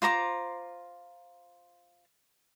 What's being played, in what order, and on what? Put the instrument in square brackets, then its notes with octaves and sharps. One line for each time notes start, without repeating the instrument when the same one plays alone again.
[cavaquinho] F4 C5 A#5 D6